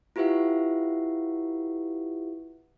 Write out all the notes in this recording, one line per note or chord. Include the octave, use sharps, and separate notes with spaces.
E4 F4 G4 B4 E5 F#5